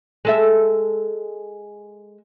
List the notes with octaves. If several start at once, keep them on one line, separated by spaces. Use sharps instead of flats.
G#3 A4 E5